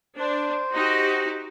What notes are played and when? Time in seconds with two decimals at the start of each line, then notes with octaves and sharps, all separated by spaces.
0.18 D4 C5
0.74 D#4 F#4 G4